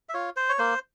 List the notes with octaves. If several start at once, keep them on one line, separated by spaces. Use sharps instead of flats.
E5
F4 C#5
C5
C#5
A#3 C5